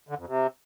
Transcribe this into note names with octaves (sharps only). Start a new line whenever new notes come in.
D3
F2
C3